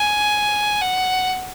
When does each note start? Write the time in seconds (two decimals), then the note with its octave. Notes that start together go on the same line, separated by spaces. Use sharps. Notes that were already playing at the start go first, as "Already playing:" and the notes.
Already playing: G#5
0.81 F#5